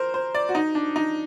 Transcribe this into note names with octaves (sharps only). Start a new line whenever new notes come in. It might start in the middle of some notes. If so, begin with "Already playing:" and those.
Already playing: A#4 C5
C5
D5
F#4
D#4
D4
D#4